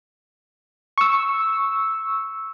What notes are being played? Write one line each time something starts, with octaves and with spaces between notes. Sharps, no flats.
C#6 E6